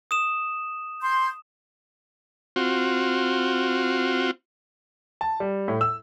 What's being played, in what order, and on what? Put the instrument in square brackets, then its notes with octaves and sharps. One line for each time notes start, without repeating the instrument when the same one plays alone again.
[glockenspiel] D#6 E7
[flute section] C6 G6
[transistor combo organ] C4 F4 F#4
[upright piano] A5
G3
A2
E6